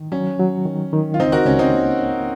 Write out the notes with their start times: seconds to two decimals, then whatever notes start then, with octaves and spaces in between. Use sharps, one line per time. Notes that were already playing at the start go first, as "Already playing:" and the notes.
Already playing: D#3
0.12 F#3 C#4
0.39 F#3
0.65 D#3
0.93 D#3
1.14 F4
1.19 C#2 C4 D#4
1.32 F#4 A#4
1.45 C#2 C#4
1.59 C4 D#4
1.73 A#3
1.99 C#4